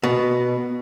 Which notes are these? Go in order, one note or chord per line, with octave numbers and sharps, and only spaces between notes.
B2